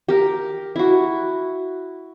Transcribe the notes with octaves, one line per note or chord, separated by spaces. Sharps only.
G4 A#4
E4 F#4